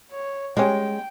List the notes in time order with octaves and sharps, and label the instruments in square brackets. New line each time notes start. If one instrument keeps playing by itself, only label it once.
[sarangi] C#5
[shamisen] G3 C#4 [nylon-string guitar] G#3 [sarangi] G5